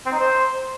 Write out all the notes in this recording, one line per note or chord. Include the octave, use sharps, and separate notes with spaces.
C4
D#4
C5